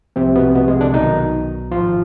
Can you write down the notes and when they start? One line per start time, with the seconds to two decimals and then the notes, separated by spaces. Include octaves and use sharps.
0.16 C2 C3 F3 C4
0.36 B2 B3
0.55 B2 B3
0.68 G#3
0.81 D3 D4
0.94 B1 B2 D#3 D#4
1.72 G#1 G#2 F3 F4